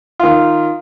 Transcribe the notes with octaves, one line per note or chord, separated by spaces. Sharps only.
D#3 F4